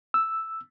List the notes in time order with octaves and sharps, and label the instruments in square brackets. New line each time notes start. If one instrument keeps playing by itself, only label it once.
[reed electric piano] E6